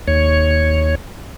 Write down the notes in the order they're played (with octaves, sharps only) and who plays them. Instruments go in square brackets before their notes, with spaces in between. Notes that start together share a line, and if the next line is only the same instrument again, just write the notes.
[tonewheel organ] D#2 C#5